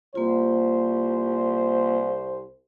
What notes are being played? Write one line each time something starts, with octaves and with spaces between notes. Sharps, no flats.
C2 A#3 F4 C5